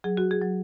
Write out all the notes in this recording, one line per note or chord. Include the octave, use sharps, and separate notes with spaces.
F#3 G#4
F#4
G#4
F#3